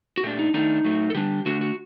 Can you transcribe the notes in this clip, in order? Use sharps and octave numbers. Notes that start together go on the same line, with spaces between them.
F#4
A#2 A3 D4 G4
D#4
D#3 A3 D4 D#4
A2 F#3 A3
A4
D3 G3 D4 G4
D3 A3 D4 F#4
F#4